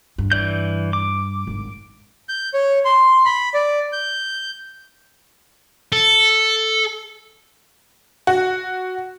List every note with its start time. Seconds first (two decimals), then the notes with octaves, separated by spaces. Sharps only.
0.18 G2
0.32 E3 D5 G6
0.93 D6
1.47 G#1 G2
2.29 G6
2.54 C#5
2.85 C6
3.26 B5
3.54 D5
3.93 G6
5.92 A4
8.27 F#4